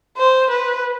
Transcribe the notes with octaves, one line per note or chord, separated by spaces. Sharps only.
C5
B4